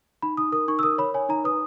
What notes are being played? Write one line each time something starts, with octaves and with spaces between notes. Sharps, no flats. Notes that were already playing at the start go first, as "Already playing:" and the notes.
D#4 B5
D#4 D#6
A#4 D#6
D#4 C#6
E6
A#4 D#6
C#5 B5
C#5 G#5
D#4 A#5
B4 D#6